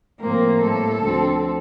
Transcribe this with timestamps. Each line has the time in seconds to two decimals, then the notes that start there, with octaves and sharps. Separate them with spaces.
0.20 A2 F3 A#3 C4 A#4
0.60 A2 G3 A#3 A4
1.02 D2 D3 F3 C4